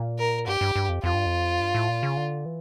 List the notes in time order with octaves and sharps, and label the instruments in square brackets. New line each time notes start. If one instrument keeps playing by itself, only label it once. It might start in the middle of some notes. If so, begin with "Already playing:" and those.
Already playing: [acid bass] A#2
[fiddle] A#4
[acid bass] G2 [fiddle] G4
[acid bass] G2
G2
F2
[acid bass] F2 [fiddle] F4
[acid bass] G2
F2
G2
A2
A#2
C#3
D3
E3